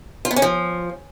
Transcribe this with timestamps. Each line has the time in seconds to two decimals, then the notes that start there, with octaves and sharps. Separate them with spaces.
0.25 F4
0.31 B3
0.36 C#4
0.42 F3